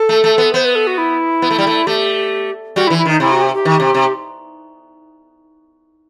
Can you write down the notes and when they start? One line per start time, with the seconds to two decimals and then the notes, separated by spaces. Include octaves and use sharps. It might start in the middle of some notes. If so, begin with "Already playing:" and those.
Already playing: A4
0.09 A3
0.24 A3
0.38 B3
0.53 B3 C5
0.65 B4
0.75 A4
0.87 F#4
0.98 E4
1.42 B3
1.51 A3
1.59 G3
1.67 A3
1.87 A3 G4
2.76 G3 F#4
2.87 E4
2.90 E3
2.98 E4
3.05 D#3 D#4
3.20 C3 E4
3.32 F#4
3.42 G4
3.54 G4
3.65 D#3
3.80 C3
3.94 C3